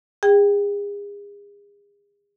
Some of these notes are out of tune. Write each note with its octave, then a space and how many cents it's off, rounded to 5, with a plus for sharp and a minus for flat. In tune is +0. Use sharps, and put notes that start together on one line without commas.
G#4 -35 G5 +5